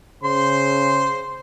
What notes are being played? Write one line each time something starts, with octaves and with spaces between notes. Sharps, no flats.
C#3 C5 C6